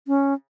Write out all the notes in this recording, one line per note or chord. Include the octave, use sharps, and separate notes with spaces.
C#4